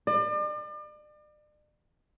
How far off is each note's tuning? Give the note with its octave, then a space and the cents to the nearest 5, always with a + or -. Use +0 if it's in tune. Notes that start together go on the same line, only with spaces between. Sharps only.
D5 +40